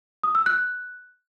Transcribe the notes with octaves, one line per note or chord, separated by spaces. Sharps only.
D#6
E6
F#6